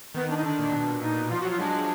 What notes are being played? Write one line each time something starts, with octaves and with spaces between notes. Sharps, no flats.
D#3 B3
D4
D#4
D3 D4
A#2
B2
A#2
A#2 D#4
B2
F3 F4
F#4
F#3
F4
G#3 D4